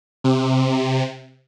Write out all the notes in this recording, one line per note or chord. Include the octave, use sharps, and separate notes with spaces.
C3